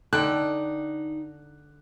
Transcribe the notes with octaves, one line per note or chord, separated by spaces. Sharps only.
D3 D#4 G5 A5 F#6